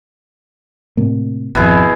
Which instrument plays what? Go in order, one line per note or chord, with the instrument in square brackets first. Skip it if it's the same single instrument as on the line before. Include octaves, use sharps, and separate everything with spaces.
[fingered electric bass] A2 C3 A#3
[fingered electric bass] G#1 F2 [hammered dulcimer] B2 E4 G#4